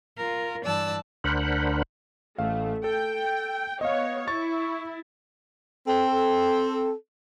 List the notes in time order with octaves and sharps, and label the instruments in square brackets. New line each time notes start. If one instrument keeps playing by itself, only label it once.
[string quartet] F4 A#4
G2 E3 D5 A5 E6 F#6
[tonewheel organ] D2 D4 A#4 C5 F#5 B5
[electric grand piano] A1 F5 [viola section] A3
[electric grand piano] A4 [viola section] G5
[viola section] B3 C#5 [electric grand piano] D#5 F5
[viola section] E4 [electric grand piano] C#6 A6
[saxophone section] C4 A4